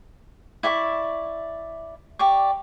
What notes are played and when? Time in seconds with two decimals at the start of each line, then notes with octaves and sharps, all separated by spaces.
0.63 E4 D5 E5 C#6
2.19 G4 D5 C#6